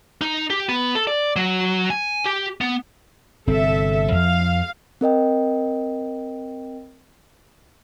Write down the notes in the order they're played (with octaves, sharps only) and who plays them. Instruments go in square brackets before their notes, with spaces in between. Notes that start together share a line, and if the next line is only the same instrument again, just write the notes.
[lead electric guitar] D#4
G4
B3
A4
D5
F#3
G#5
G4
B3
[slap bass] G1 C3 C4 [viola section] A4 E5
[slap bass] F2 F3 [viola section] F5
[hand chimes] C4 A#4 D#5 G5